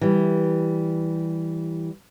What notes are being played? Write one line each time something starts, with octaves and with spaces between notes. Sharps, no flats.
E3 G3